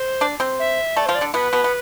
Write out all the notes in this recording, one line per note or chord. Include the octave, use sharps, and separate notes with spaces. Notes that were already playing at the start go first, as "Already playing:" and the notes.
Already playing: C5
D4 D5
C4 C5
E5
A3 A4 D5
F3 F4 C5
D5
D3 D4
B2 B3 B4
B2 B3
B3